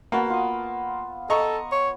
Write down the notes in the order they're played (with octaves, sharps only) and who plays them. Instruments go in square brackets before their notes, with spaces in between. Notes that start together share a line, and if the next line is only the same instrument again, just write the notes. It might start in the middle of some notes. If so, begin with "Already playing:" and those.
[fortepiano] A#3 [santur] B3 F#4 A5
[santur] F4 D#6
[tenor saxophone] A4 [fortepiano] D#5 A#5 C#6
[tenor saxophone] C#5